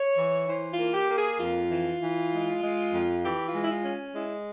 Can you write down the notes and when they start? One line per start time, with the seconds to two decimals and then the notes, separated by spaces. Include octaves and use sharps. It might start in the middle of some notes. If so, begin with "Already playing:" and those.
Already playing: C#5
0.17 E3
0.48 E3 C5
0.71 F4
0.78 A#3
0.94 G4
1.09 A#3
1.16 G#4
1.39 F2 F4
1.70 E3
2.01 E3
2.32 G#3
2.62 G#3
2.92 F2
3.23 E3 G4
3.47 F4
3.53 G#3
3.64 E4
3.70 F4
3.84 C#4
4.15 G#3 E4